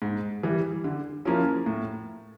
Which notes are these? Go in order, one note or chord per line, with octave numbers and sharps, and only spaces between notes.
G#2
E3 G3
D3
F3 A#3 C#4 E4
A2